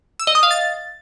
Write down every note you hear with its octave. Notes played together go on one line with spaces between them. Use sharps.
E6
D#5
D#6
F5
A6